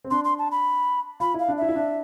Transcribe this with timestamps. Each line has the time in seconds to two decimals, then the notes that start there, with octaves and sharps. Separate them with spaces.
0.04 C4
0.11 D4 C6
0.24 C6
0.39 A5
0.51 B5
1.20 F4 B5
1.34 E4
1.39 F5
1.48 D4
1.58 E4 E5
1.69 E4
1.75 D4